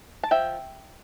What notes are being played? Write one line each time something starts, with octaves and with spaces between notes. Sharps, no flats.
A5
F3 E5 G5